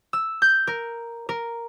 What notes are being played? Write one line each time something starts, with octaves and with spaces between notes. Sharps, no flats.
E6
G6
A#4
A#4